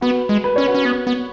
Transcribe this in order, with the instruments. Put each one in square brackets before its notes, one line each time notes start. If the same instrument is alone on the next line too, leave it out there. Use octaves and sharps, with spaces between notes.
[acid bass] B3 [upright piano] F#4 B4
[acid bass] G#3
[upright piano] B4
[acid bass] C#4 [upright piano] C#5
[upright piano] F#4 B4
[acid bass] C#4
B3
B3